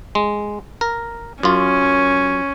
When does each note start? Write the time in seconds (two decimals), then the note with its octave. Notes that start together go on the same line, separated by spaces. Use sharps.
0.15 G#3
0.81 A#4
1.43 F#2 C#4 F4